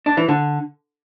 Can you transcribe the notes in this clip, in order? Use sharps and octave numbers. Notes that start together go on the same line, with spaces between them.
D4
E3
D3